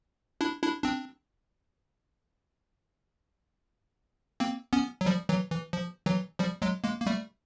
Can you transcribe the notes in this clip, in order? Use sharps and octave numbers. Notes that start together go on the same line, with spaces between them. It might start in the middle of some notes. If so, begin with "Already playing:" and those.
D4 E4
D4 E4
C4 D4
A#3 C4
B3 C#4
F#3
F3 G3
E3 F#3
E3
F3
E3 F#3
F3 G3
F#3 G#3
G#3 A#3
A#3
G3 A3